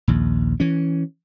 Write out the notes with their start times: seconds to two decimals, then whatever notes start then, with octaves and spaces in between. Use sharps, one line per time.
0.08 A#1 D#2
0.60 E3 C#4